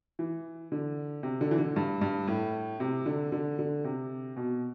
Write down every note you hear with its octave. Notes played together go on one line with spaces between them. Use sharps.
E3
D3
C3
D3
E3
D3
G2
G2
A2
C3
D3
D3
D3
C3
B2